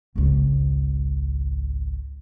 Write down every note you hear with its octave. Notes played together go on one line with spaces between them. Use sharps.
G#1 C#2